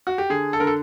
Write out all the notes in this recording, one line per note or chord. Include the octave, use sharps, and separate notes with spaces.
F#4
G4
D3 G#4
A4
D3 A#4
A4